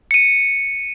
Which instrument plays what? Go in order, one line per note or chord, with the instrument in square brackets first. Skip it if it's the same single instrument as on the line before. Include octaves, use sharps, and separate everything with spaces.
[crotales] C#7 D#7